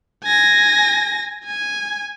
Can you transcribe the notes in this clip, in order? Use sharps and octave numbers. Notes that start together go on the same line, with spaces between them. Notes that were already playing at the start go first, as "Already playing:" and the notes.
G#5 A#6
G#5